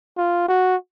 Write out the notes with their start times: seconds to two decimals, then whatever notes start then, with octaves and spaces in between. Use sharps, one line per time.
0.18 F4
0.48 F#4